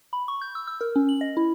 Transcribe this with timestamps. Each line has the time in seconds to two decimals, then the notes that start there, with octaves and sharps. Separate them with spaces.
0.13 B5
0.28 C#6
0.41 G6
0.55 E6
0.67 E6
0.81 A#4
0.96 C#4
1.09 F#7
1.21 D#5
1.37 E4